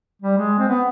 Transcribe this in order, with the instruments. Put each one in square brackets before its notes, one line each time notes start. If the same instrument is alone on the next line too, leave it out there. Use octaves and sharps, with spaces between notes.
[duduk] G3
G#3
C4
B3